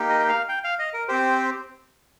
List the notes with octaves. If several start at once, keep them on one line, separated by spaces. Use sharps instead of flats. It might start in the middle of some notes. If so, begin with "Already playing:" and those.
Already playing: A#3 D#4 G4
D#5
G5
F5
G5
F5
D#5
A#4
C4 G4 C5